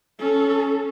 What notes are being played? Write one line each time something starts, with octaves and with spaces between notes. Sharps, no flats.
C#4 A4